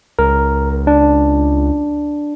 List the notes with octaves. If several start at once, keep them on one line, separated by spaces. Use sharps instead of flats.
C#2 A#4
D4